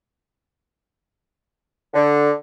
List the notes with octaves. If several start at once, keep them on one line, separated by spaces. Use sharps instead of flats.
D3